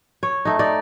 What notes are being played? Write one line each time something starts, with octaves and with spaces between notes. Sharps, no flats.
C#5
A3 D#4
D#4 D5